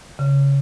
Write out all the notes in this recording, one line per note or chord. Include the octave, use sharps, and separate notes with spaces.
C#3